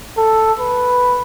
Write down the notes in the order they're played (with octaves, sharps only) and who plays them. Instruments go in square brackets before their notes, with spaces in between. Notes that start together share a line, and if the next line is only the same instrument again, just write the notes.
[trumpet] A4
B4